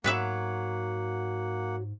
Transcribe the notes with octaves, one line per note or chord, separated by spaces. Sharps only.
G#2 F#3 A#3 B3 B4 E5 F#5